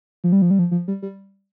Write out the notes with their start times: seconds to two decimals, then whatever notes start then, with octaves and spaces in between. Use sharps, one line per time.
0.24 F3
0.32 G3
0.42 F3
0.51 G3
0.59 F3
0.71 F3
0.88 G3
1.02 G3